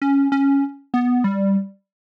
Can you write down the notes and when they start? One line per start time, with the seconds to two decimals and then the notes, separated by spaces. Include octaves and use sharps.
0.02 C#4
0.32 C#4
0.94 B3
1.24 G3